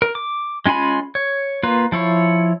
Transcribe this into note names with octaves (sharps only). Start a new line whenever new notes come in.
A#4
D6
G#3 C#4 F4 G#5 B5
C#5
A#3 F4 B4
F3 E4 C#5